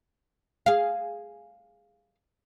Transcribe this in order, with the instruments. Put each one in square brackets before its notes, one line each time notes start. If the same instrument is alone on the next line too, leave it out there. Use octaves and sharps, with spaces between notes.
[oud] G#4 F5